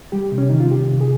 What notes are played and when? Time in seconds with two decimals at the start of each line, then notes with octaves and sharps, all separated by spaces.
0.12 G3 G4
0.32 C3
0.38 C#4
0.49 D#3 D#4
0.60 F4
0.71 C3 G4
0.91 C3
1.01 G#4